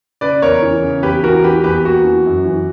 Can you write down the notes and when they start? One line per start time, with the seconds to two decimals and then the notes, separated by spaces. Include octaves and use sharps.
0.21 C#3 B4 D5
0.42 E2 A#4 C#5
0.62 E3
0.82 C#3
1.03 E2 G4 B4
1.23 E3 F#4 A#4
1.44 E3 G4 B4
1.64 E2 G4 B4
1.85 A#3 F#4
2.04 E3
2.26 F#2
2.45 E3